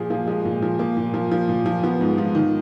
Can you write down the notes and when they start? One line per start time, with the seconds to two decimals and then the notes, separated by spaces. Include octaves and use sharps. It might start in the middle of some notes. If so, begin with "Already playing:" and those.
Already playing: A#2 F3 G#4
0.10 F3 A#3
0.27 F3 G#3
0.45 A#2
0.62 F3
0.79 F3 A#3
0.97 A#2
1.14 F3
1.31 F3
1.49 A#2
1.66 F3
1.83 F3 B3
2.01 G#2
2.18 F3
2.35 D#3